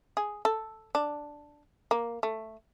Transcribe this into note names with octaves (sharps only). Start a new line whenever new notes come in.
G#4
A4
D4
A#3
A3